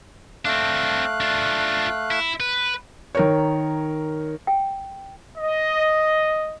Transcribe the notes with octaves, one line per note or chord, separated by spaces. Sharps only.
A3 C4 D4 F5 F#6
D4 F4
E4
B4
D#3 A#4 C#5
G5
D#5